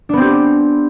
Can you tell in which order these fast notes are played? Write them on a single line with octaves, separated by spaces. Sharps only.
D4 B3 C4 G4